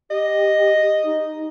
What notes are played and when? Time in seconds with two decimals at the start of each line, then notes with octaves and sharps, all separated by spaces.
0.10 G4 D#5
1.04 D#4